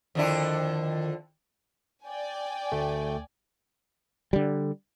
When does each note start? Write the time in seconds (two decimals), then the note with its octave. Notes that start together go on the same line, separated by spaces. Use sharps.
0.15 F2 D3 D#3 E4
2.04 D5 G5 G#5
2.72 D2 A3
4.33 D3 G3